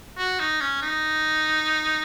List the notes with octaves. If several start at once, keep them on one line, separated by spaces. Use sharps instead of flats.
F#4
D#4
C#4
D#4